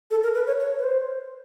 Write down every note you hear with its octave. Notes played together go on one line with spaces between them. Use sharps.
A4
A#4
B4
C#5
C#5
B4
C5